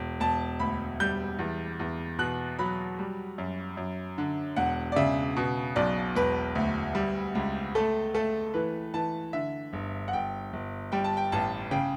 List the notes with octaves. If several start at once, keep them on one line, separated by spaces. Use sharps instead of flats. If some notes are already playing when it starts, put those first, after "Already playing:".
Already playing: E1
E1 A5
D2 B5
G3 G6
E2
E2
B2 F#6
F#3 B5
G3
F#2
F#2
D3
E1 F#5
D5
C#3 E5
B2
B1 D5
E1 B4
D2
G3
C#2
A3 A4
A3 A4
E3 B4
E3 A5
D3 E5
G1
F#5
G1 G5
G1
G3 G5
A5
G5
A1 A5
C#3 G5